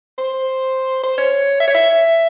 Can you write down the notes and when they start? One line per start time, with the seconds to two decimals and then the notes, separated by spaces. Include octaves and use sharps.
0.18 C5
1.03 C5
1.18 C#5
1.60 E5
1.68 C#5
1.74 E5